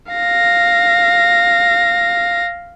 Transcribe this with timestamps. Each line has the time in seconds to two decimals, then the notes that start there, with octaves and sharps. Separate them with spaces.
0.12 F5 A#6